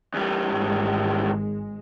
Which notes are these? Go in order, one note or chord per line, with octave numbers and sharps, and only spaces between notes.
E2 G3
G#1 G#3